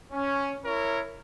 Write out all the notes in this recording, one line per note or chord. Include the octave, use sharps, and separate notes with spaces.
C#4
E4 A#4 C#5